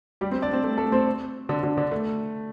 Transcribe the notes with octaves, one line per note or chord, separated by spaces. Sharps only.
G3 G4
C4 C5
D4 D5
C4 C5
A3
A3 A4
C4 C5
D3 D4
D3 D4
D3 D4
A3